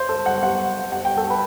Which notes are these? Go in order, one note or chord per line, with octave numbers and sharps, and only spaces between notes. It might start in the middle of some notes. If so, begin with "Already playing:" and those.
Already playing: C5
A4
F#5
F#5
F#5
G5
A4
B4